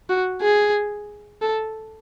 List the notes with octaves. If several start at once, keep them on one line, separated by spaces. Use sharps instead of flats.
F#4
G#4
A4